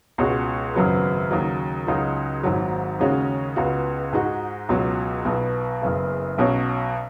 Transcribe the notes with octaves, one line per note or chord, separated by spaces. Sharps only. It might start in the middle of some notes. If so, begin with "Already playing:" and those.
C#2 B2 G#3 C#4 F#4
G#1 F#2 C#3 F#3 B3
D#2 C#3 F#3
C#2 C#3 F#3 D#4 F#4
G#1 G#2 F#3
D#2 C#3 G#3 C#4 F#4
C#2 C#3 B3 F#4
G#2 G#3 D#4 F#4
C#2 B2 F#3
B1 B2 B3
F#1 F#2 C#3 B3
B1 B2 F#3 C#4